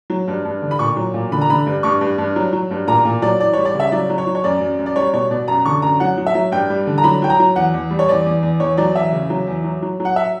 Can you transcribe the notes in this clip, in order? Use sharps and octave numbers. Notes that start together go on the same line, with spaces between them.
F#3
G2
G2
D3
B5
A#2 C#6
F#3
A#2
D3 B5
A#5
D3 B5
G2
G2 C#6
G2
G2
F#3
F#3
G2
A#2 A#5
A#2
F#3 D5
E3 D5
G3 C#5
D5
C#3 E5
F#3 D5
F#3
C#5
F#3
C#5
F#2 D5
F#2
F#2
D5
G3 C#5
B2 C#5
B2 D5
F#2 A#5
D3 C#6
F#2 A#5
F#3 F#5
F#3
E5
F#3
G2 G5
G3
D3
A#5
F#3 B5
F#3 G5
A#5
F#3
E2 F#5
E2
G3
C#5
E2 D5
E2
E2
E2 C#5
F#3 D5
E2 E5
C#3
F#3
E2
F#3
F#3
F#3
F#5
E5